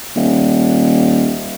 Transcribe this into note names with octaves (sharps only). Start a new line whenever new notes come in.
D#1